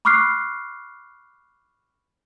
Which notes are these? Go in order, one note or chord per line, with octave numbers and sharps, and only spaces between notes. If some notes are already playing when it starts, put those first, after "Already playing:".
B5 C#6 D6 F6 F#6 C7